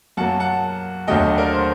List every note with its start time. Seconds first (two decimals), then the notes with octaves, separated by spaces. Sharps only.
0.17 F#2 F#3 A#3 F#5 A5
0.40 F#5 A5
1.07 D#2 D3 F#3 A3 D#5 G5
1.38 A#4 D5
1.53 C5